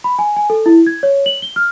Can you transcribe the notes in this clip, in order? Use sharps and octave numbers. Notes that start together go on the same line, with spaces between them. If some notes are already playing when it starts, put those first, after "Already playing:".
B5
G#5
G#5
A4
E4
G#6
C#5
F#7
G7
F6